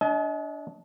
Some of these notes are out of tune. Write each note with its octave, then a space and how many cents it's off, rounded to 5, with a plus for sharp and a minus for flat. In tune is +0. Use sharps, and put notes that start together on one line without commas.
D4 -15 D#5 +35 G#5 +45